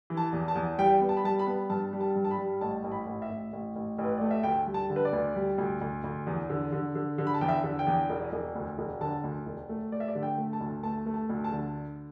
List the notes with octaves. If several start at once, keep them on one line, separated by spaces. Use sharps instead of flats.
E3
A5
E2
A5
E2
G3 G5
B3
A5
B5
G3 A5
B5
B3
G2 A5
G3
A5
G2
A5
B5
G3
A1 A5
A1
B5
A1
E5
A1
A1
A1
A1
B4
A3 D5
E5
D2 G5
G3
A5
D3
B4
D5
D2
G3
D2
D2
D2
E2
D3
D3
D3
D3
B5
A5
E2 G5
E5
D3
G5
E2
E1
E1
D2
E1
D3 A5
D2
E1
A3
A3 D5
E5
D5
D3
G5
A3
A5
D2
A3 A5
A3
A5
D2
A5
D3